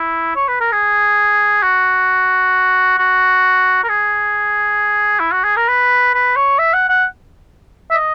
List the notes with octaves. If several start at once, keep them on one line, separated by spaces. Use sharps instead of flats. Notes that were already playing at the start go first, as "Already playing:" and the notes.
Already playing: E4
C#5
B4
A#4
G#4
F#4
F#4
A#4
G#4
E4
F#4
G#4
A#4
B4
B4
C#5
E5
F#5
F#5
E5
D#5